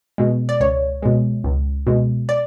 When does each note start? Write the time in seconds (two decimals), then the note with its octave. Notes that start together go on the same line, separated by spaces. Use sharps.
0.18 B2 G#3
0.49 D5
0.60 C#2 C#5
1.02 B2 G#3
1.44 C#2
1.87 B2 G#3
2.29 D5